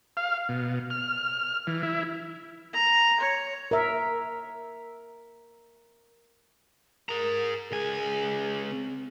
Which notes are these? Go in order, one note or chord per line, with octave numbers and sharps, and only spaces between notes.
F5
B2
F6
E3
E4
A#5
C#5
A#4 E5
G#4 A#4 A#5
C#2 G#4 G#5
C4